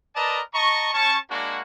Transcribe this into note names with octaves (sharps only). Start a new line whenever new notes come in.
A#4 B4 D5 D#5 A5 A#5
D#5 A5 A#5 C#6
C#4 A5 C#6
G#3 A#3 D4 F#4